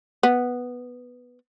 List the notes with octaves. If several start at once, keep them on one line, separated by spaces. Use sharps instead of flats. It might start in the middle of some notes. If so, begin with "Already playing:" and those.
B3